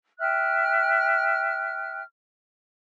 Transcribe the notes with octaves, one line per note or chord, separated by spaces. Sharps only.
E5 G5 F6 F#6